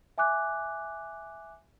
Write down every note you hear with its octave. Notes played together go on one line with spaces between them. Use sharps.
E5 G#5 D6 F#6